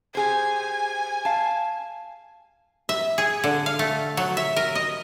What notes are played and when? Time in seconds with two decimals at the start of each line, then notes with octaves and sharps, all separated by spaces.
0.15 G4 G#4 C5 G#5
1.25 F5 A5
2.89 E5
3.18 G#4
3.44 D3
3.66 F5
3.79 A3
4.17 F#3
4.37 E5
4.56 A#4
4.75 D#5